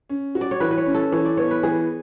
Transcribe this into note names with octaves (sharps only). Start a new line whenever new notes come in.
C#4
F#4
D5
C#5
E3 B4
B4
C#5
C#4
A4
E3 C#5
D5
B3 C#5
B4
E3 G#4